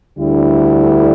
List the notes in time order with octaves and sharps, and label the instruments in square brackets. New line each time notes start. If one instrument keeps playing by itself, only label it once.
[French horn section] D2 D3 G3 E4